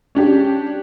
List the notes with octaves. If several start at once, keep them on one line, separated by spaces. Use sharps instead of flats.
C#4 D4 G4